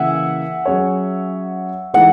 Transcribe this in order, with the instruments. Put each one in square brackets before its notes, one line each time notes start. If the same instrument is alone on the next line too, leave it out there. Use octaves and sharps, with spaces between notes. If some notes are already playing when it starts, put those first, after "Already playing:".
Already playing: [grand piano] C#3 E3 A#3 E4 [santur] E5 F#5 G#5
[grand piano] F#3 C#4 G#4 C#5
[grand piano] E3 G#3 D#4 [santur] F#5